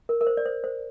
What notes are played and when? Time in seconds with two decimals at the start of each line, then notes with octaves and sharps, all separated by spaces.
0.09 A#4
0.21 A#4
0.27 C5
0.37 D5
0.46 C5
0.64 C5